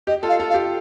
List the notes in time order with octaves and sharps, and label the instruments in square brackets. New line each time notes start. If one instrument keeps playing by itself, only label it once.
[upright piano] G4 [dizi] D#5
[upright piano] F4 A4
[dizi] F5
[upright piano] F4 A4
[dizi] F5
[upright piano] G4